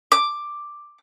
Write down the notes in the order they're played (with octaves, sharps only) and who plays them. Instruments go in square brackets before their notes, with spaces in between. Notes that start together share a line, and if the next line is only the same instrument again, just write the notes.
[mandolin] D6